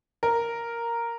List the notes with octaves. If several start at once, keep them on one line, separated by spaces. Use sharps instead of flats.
A#4